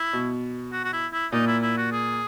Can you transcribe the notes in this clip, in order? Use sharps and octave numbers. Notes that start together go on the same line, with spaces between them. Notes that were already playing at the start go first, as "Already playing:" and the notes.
Already playing: E4
B2
F#4
F#4
E4
E4
A#2 D#4
E4
E4
F#4
G#4